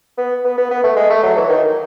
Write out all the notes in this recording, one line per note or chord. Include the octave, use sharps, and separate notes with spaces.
B3
B3
B3
B3
A3
G#3
A3
F#3
E3
D#3